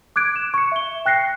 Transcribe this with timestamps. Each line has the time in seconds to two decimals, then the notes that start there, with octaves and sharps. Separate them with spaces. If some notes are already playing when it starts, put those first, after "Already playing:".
0.16 D6 F#6 G#6 D7
0.36 E7
0.54 C#6 C#7
0.72 E5 G7
1.06 G5 F#6 A#6 C7 C#7